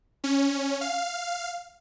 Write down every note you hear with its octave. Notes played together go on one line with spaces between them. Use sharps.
C#4
F5